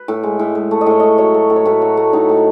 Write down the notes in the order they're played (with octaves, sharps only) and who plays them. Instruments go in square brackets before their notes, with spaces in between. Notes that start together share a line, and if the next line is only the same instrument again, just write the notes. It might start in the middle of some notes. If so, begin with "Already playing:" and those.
Already playing: [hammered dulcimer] B4
A2
G#3
A2
G#3
A3
D#5
A2 C#5
A2 D#5
F#3 C#5
A3
A2
C#5
A2 B4
F#3
A3
A2 D#4
A2